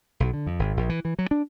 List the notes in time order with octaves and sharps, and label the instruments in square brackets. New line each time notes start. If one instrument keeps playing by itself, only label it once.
[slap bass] B1
D3
F2
G#1
A#1
E3
E3
F#3
D4